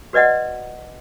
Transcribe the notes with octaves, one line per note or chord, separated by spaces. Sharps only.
F#4 B4 D5 D#5 F#5